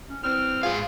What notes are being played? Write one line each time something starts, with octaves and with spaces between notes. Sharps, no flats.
C#4
E3 G3 C4 F6
G#2 B3 F4 G#4 F5